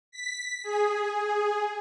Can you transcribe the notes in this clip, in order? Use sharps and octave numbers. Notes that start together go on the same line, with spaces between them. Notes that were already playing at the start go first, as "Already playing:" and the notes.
B6
G#4